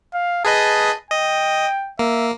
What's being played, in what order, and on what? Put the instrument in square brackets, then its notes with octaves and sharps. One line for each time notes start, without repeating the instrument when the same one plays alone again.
[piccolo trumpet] F5
[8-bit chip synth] G#4 B4 D#5 [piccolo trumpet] A5
[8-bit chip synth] D#5 [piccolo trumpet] G5
[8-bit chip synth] A#3 [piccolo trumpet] E5